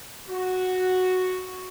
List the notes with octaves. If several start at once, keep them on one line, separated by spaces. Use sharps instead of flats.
F#4